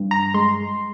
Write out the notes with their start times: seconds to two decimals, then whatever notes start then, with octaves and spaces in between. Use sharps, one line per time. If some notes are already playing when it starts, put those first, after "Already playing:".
Already playing: G2
0.11 A#5
0.34 G#3 C6